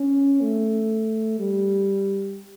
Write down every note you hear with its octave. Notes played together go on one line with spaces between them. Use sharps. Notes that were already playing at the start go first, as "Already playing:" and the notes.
Already playing: C#4
A3
G3